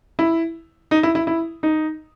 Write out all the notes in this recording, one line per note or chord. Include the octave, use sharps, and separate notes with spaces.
E4
D#4
E4
E4
E4
D#4